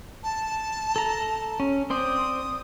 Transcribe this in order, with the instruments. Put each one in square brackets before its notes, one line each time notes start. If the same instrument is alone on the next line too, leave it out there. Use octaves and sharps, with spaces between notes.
[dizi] A5
[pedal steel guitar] A4 A#5
C#4
[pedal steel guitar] C4 C5 D5 [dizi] D#6